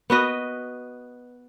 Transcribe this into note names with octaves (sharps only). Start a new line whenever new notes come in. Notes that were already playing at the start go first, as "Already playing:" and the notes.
B3 F#4 B4 D#5